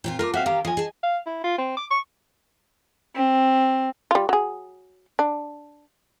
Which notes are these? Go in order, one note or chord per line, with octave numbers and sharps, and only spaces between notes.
A#2 C4 F4
A3 F4 A#4 D6
C4 F#4 E5 F5
D#3 G4 F5 A#5
F3 D#5 G#5
G#4 A5
F5
E4
F4
C4
D6
C#6
C4
G3 F4
F#3 G#4
D4